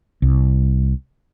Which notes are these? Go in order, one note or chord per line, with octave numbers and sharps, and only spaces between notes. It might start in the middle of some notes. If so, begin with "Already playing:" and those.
C2